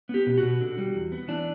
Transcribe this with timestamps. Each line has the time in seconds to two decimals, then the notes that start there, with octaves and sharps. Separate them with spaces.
0.09 B3 G4
0.27 B2
0.38 B2 F#4
0.61 D3
0.78 G3
0.94 E2
1.12 B3
1.28 E3 D4